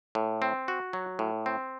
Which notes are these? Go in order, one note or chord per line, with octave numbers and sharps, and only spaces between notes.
A2
C4
F#4
F#3
A2
C4